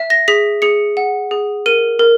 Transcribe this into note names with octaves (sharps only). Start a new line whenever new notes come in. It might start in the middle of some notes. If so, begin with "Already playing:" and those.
Already playing: E5
A#6
G#4 B6
G#4 C#7
F#5
G#4
A#4 D#7
A#4